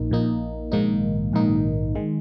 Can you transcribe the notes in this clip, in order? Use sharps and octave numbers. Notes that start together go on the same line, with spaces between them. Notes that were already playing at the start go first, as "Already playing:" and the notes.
Already playing: A#1 A#2 A#3 D#4
A#1 A#2 A#3 D#4
A#1 G#2 D#3 A#3 D#4
A#1 G#2 D#3 A#3 D#4
D#3 G#3